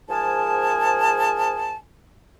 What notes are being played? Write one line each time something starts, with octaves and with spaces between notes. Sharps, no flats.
G#2 F3 G#4 A#4 G#5 A5